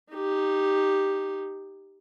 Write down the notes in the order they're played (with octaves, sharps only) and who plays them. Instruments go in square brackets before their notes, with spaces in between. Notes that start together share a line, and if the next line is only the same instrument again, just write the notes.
[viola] D#4 G4